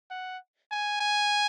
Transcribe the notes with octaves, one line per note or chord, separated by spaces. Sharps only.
F#5
G#5
G#5